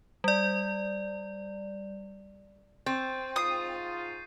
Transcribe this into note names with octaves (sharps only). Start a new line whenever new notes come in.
G3 D5
C4 C#6 G6 A6
G#2 F4 D#6 C7 D#7